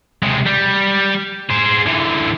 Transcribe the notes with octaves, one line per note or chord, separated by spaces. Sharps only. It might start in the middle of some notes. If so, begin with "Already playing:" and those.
C3 G#3
G3
G#4 C5
D3 E3